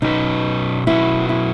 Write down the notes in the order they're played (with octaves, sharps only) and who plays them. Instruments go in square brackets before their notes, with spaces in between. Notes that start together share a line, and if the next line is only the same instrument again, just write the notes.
[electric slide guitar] B2 F#3 C#4 F#4 B4 [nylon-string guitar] D#4
[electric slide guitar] B2 F#3 C#4 F#4 B4 [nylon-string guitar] E4
[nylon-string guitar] E4